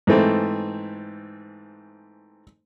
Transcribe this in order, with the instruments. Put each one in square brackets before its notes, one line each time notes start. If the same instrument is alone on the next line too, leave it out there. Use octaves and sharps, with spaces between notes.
[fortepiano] G#2 E3 A3 C4